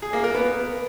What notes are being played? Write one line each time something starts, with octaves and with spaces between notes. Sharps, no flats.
G#4
A#3
A#4
B3